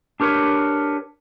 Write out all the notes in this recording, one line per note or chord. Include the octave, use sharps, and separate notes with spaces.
D4 G4 A#4 B4 C#5